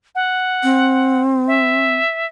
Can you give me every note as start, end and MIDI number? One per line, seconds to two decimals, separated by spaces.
0.15 1.22 78
0.63 1.96 60
1.48 2.27 76